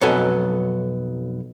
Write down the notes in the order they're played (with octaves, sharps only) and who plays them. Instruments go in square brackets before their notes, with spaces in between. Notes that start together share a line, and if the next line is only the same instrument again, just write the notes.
[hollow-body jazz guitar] B1 F2 F#3 B3 A4 G#5